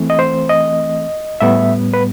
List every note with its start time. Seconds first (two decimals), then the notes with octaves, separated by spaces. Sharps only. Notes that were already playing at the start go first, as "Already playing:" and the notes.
Already playing: E3 A3 C4
0.10 D#5
0.19 C5
0.50 D#5
1.40 A2 G3 B3 E5
1.94 B4